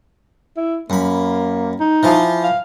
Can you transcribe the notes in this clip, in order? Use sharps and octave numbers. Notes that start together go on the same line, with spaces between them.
E4
F#2 A#3 B5
D#4
E3 F3 F4
F5